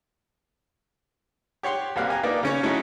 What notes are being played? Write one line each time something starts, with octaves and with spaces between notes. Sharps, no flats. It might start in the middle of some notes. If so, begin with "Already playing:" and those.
G4 C#5 F#5 C6
C2 F#2 G3 A#3 F5 F#6
G4 G#5 A#5
A#3 B3 D4 D#4 D5
C#3 C#4 C#5
F#3 G#3 A3 C#4 D#4 E4